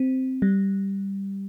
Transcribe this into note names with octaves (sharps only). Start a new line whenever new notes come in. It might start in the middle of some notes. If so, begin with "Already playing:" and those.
Already playing: C4
G3